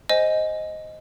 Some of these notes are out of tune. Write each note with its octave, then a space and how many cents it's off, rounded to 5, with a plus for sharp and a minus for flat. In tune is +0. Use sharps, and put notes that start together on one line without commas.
C5 +0 D#5 +0 G#5 +0